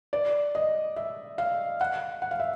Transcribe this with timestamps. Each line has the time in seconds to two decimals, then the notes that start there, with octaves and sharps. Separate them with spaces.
0.13 D5
0.55 D#5
0.96 E5
1.38 F5
1.81 F#5
2.22 F#5
2.31 F5
2.40 E5